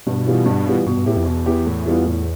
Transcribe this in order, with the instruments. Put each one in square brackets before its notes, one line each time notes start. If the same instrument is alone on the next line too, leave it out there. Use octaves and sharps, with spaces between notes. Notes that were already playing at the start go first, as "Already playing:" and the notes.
[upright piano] G2 [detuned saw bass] B2
[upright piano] E3 G3 B3 F4
G2
E3 G3 B3 F4
[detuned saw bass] G2 [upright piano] B2
[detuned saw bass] G2
[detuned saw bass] A2 [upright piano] B3 E4 G4
[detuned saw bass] F2
[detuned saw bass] E2 [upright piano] B2
[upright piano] B3 E4 G4
A2
E3 G3 B3 F4
A2